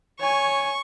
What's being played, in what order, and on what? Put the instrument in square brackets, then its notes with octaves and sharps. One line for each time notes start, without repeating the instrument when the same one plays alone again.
[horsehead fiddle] C#5 G#5 [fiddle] C#6